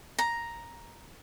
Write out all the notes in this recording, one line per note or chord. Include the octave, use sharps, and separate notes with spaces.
A#5